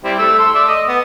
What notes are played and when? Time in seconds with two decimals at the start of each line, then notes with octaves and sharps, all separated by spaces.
0.04 G3 C4 E4
0.19 A3 E6
0.39 A4 C6 E6
0.55 A3 D5 E5
0.68 D#5
0.88 B3